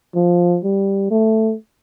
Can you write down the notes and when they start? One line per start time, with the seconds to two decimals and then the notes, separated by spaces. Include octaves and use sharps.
0.15 F3
0.64 G3
1.11 A3